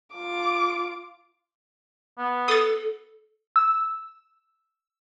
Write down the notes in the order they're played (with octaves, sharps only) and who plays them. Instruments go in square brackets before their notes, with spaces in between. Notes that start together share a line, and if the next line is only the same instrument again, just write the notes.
[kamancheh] F4 D6
[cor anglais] B3
[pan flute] A4 [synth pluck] D#6 A6
[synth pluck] E6